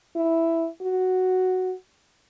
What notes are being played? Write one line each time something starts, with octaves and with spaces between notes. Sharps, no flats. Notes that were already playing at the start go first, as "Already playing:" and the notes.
E4
F#4